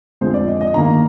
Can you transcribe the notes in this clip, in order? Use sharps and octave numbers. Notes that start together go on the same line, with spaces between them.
F2 D3 F3 G#3 C5
D5
D#5
D#5
G2 D#3 A#3 A#5